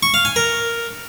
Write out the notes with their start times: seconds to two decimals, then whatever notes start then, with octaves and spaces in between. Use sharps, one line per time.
0.03 C#6
0.14 F5
0.25 G#5
0.36 A#4